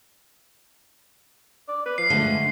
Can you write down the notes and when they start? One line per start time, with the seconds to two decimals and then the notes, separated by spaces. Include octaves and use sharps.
1.68 D5
1.85 B4
1.98 F3 C7
2.10 D3 G#3 A3